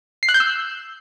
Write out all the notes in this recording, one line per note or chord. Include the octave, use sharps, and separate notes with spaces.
C7
F#6
G6
E6